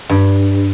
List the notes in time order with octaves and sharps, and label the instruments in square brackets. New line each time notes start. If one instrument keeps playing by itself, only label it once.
[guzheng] G2